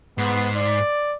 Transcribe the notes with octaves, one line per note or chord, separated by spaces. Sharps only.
G#2 B3
D5